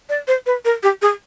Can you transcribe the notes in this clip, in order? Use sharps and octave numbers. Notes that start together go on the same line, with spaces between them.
D5
C5
B4
A#4
G4
G#4